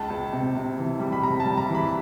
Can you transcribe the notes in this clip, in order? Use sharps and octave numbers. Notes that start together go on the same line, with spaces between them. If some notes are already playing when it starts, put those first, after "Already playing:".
Already playing: C#2 A5
C#2
C3
C3
E3
G3
B5
C3 A#5
A5
G3
A#5
E3
B5